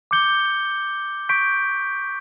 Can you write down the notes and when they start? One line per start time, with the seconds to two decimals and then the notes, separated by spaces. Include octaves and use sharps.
0.11 D6 G6 C#7 G7
1.29 C#6 G6 B6 D7